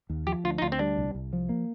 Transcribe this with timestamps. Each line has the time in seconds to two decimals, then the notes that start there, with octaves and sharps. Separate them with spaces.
0.09 D#2
0.27 F3 G4
0.44 D2 F4
0.58 D#4
0.62 D2 F4
0.72 C4
0.79 G3 D4
0.97 C2
1.15 C2
1.33 F3
1.49 A#3